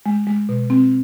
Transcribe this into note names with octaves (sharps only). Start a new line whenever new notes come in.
G#3
G#3
B2
C4